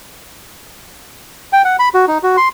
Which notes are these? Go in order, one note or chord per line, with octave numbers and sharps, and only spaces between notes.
G5
F#5
B5
F#4
D#4
F#4
C6